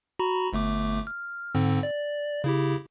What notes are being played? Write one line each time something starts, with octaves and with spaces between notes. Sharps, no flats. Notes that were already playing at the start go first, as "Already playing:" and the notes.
F#4 A#5 B5
G1 A3 D6
F6
G#2 D3 C4
D5
C#3 E4 G4